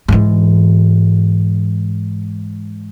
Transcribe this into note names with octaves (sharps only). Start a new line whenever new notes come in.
G#2 E3